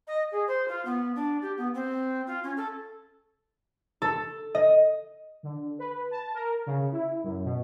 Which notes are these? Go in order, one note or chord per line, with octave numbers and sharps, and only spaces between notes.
D#5
G#4
C5
F4
B3
D4
G4
B3
C4
F4
C#4
A4
A4
D#5
D3
B4
A5
A#4
C#3
E4
F#2
B2